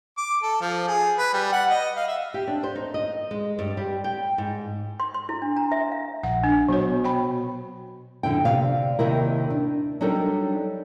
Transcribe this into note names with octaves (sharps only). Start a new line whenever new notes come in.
D6
A4
F3
G#4
B4
G3
F#5
D#5
F5
E5
G4
D4
C5
D#4
D#5
G#3
G2
G3
G5
G#2
C6
C6
E4
D4
A#5
E5
F5
A#1 F#5
D4
B2 F#3 C#5
G5 B5
F2 D3 E4 G5
C3 D5 F5
D#2 C3 D#3 E4 A#4
D4
F#3 G3 D4 D#4 A4 A#4